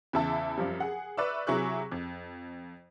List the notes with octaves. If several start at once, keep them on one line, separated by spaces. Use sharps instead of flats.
E2 C#3 E4 E5 A5
F#2 F3 G3
G#4 F#5
B4 D5 E5 C#6 E6
C3 F#3 E4 G#4 C#6 F#6
F2